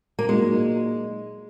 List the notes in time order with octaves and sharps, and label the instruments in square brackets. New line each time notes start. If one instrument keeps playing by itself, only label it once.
[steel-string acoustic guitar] A#3
[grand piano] A#2 F#3 A#3 D#4 [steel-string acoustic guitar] G#3